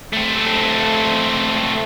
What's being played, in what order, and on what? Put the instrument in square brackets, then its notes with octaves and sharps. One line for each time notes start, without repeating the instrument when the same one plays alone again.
[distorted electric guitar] A3 C4